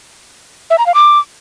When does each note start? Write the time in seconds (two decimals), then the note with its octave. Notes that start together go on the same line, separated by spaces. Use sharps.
0.70 E5
0.78 A#5
0.86 F5
0.94 D6